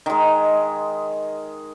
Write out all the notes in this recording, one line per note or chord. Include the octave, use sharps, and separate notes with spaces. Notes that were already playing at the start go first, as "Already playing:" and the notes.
D#3 G#3